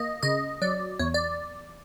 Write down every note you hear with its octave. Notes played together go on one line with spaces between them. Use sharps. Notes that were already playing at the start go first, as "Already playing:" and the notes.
Already playing: A#3 D#5
C#3 D#5
F#3 D5
E2 C#5
D5